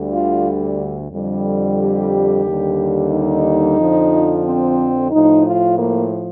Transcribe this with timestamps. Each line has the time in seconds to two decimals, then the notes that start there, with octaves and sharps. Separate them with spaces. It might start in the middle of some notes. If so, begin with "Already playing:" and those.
Already playing: D2 D3 G3
0.13 F4
1.12 F2 D3 G3
1.79 G4
2.45 D#2 D3 G3
3.12 D#4
3.79 F2 D3 F3
4.45 C4
5.11 A2 F3 D#4
5.45 F4
5.78 A#3